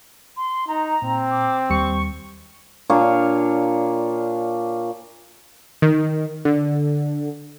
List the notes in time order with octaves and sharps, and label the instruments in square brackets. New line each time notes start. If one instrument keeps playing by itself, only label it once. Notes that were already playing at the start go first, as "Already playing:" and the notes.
[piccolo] C6
[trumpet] D#4 [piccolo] A#5
[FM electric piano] A#2 [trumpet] C4
[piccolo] D6
[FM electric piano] D#2 G3 C#7 [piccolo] C#6
[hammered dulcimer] A#2 D4 C#5 F5
[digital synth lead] D#3
D3